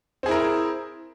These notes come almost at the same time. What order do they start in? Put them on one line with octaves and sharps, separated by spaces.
C4 G#4 E4 A#4